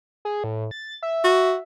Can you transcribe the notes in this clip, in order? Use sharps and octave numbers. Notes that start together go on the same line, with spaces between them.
G#4
A2
A6
E5
F#4